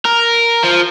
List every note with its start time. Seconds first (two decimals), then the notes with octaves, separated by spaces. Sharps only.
0.05 A#4
0.64 F3